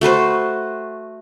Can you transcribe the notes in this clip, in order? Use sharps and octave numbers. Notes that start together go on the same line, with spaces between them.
A3 F#4 B4 C5